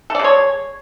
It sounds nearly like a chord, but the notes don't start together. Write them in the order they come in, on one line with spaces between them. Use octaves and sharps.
A4 D5 G#3 C#5